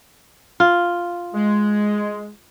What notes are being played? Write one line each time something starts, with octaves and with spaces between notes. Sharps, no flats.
F4
G#3